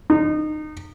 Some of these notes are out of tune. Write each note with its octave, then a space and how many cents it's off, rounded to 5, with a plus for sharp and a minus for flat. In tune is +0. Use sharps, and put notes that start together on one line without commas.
D#4 -25